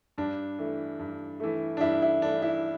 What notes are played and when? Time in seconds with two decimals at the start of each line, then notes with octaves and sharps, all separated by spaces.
0.18 G2 D4
0.59 E3 A3
0.99 G2
1.40 E3 A3
1.77 D4
1.81 G2 E4
2.02 E4
2.22 E3 A3 D4
2.42 E4